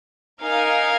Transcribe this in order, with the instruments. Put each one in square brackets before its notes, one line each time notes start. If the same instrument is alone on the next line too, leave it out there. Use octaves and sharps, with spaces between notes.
[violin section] D#4 A#4 F5 G#5